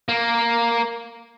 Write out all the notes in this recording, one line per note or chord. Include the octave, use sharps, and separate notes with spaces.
A#3